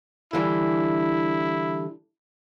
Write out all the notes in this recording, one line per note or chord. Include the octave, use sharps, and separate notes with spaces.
D3 E3 G3 E4